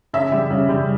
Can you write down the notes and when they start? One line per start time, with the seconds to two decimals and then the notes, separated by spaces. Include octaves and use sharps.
0.13 C#3 E5
0.32 G3
0.50 C#3
0.69 G3